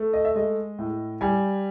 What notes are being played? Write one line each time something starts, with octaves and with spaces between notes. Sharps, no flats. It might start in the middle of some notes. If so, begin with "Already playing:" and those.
Already playing: A3
D#5
E5
G#3 D#5
A2
G3 G#5